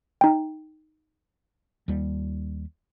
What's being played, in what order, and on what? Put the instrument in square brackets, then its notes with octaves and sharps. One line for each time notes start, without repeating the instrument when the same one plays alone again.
[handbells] D#4 G5
[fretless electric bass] D#2 G3